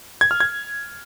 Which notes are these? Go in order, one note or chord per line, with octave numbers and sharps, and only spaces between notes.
G#6
F6
G#6